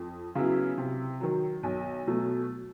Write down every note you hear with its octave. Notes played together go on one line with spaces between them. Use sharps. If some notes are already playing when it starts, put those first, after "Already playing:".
Already playing: F2
C#3 F#3 B3 E4
C3
D#3 F#3
B1
B2 F#3 A3